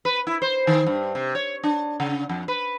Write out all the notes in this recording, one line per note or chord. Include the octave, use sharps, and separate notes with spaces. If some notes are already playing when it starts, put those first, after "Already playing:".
B4
E4
C5
D#3
G2
C3
C#5
D4
C#3
F2
B4